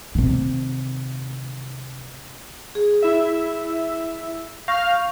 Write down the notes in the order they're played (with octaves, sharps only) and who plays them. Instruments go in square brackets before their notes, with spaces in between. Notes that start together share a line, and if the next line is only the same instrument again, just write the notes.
[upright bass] C3 D#3
[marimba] G#4
[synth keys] E4 E5
[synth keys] F5 F6 [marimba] C#6 G6 A#6